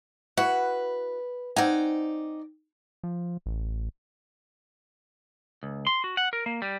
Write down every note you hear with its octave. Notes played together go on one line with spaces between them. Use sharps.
E4 F#4 B4 F#5
C4 D#4 D5 F#5 G#5
F3
A1
C#2
C6
F#4
F#5
A#4
A#3
G3